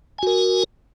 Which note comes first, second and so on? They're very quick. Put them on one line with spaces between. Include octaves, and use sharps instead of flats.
G#5 F#4 A#4